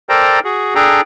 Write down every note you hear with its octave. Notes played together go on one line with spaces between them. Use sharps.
A4 A#4 C5 D5 G5 A#5
F#4 G#4
D4 G#4 A4 G5 A#5